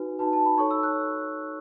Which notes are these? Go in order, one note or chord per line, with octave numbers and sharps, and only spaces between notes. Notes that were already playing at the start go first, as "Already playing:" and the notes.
Already playing: D#4 F#4 B4 G#5
D#4 F#4 B4 A5
A5
B5
D#4 A4 C#5 C#6
E6
F#6